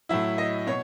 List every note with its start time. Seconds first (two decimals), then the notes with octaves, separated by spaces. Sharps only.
0.09 A2 F#3 E4 E5
0.38 D#5
0.67 B2 C#5